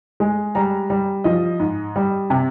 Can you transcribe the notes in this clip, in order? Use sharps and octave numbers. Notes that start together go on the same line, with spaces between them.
G#3
G3 A#5
G3
F3 D#5
G#2
G3
C3